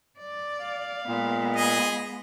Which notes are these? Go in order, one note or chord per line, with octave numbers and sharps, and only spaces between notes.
D5
F5
A#2 G#3 B3
G#4 D#5